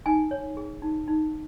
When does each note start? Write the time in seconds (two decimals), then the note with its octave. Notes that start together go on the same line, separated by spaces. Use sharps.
0.06 D#4 G#5
0.31 C#5
0.57 G#4
0.82 D#4
1.08 D#4